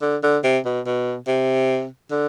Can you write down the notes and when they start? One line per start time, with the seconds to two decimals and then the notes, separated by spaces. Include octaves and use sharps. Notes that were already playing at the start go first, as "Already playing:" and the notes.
0.01 D3
0.23 D3
0.44 C3
0.65 B2
0.86 B2
1.27 C3
2.11 D3